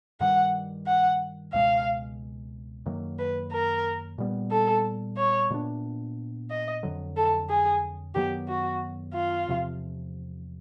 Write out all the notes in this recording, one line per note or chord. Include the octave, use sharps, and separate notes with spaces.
G2 D#3 G3 F#5
F#5
C#2 B2 G#3 F5
F#2 D#3 F#3 A#3
B4
A#4
A#2 G3 B3
A4
C#5
A#2 F#3 B3 D4
D#5
F2 D3 F#3
A4
G#4
F#2 D#3 F#3 B3 G4
F#4
F4
E2 C3 F3